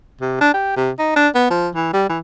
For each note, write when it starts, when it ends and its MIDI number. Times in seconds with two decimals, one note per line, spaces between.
0.21 0.40 48
0.41 0.51 62
0.54 0.75 67
0.76 0.91 48
0.99 1.15 63
1.16 1.28 62
1.35 1.50 59
1.50 1.69 53
1.75 1.92 52
1.93 2.07 55
2.09 2.19 52